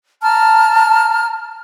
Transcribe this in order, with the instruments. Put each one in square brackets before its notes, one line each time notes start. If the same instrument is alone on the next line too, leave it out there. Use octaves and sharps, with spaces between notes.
[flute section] A5 A#5 F6